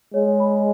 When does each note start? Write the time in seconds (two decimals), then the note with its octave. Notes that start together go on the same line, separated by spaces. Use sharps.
0.14 G#3 C#5
0.40 B5